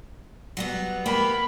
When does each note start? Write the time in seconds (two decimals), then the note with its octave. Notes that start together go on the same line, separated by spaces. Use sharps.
0.57 F#3 G3 B3
1.06 A#3 B3 G4 B5